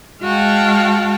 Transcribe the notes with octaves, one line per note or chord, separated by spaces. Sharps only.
G#3 F#4 F5 G5 A5